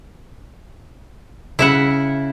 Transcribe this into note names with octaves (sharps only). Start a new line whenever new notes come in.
C#3 E4 E5 F#5